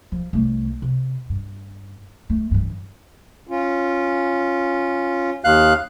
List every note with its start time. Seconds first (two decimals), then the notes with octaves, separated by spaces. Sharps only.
0.12 F3
0.33 C2 A3
0.82 C3
1.29 G2
2.30 A3
2.51 G2 E3
3.47 C#4 F4
5.44 D#2 F5 F#6